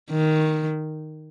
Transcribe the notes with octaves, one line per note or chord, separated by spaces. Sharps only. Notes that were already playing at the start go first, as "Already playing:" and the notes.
D#3